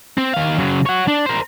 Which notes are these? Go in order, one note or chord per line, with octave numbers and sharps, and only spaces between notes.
C4
D#3 F5
C#3 F#3
C#5 F#5
D4
A#4 C5